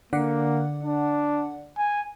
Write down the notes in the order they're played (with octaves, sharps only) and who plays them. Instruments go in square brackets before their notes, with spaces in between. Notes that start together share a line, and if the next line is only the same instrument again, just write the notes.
[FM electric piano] D3 D5 F#5 [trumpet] A#3
[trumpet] D4
G#5